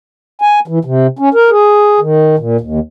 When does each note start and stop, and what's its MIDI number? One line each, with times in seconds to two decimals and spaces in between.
0.42 0.60 80
0.68 0.79 52
0.85 1.07 48
1.19 1.29 61
1.34 1.50 70
1.50 2.00 68
2.00 2.36 51
2.39 2.57 46
2.61 2.79 39